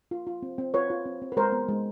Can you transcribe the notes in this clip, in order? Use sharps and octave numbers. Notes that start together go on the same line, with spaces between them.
F4
F4
C4
C4
F4 B4 C#5
F4
C4
C4
B4
G#3 A#4 C5
B3
G#3